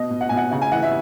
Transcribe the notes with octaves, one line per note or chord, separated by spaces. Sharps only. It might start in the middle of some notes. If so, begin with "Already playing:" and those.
Already playing: B2 D#5
B2
F#5
B2 G#5
F#5
C#3 F#5
G#5
E3 F#5
E5